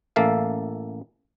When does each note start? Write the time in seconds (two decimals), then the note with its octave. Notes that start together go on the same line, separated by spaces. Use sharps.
0.16 A1 A#3 A4 E5 F5